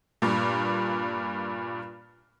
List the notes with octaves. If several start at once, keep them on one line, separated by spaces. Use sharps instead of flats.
G2 A#2